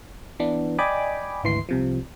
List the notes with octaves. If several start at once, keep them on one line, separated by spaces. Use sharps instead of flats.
E3 B3 D4
D5 D#5 G5 G#5 B5 D6
G#1 D2 E3 C6 C7
C2 C3 F3